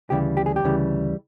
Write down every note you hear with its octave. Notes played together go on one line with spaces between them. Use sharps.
D2 C#3 E3 G3 G4
G4
G#4
G4
D2 C#3 E3 G3